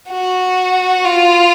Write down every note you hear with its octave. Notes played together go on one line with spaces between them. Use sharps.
F#4
F4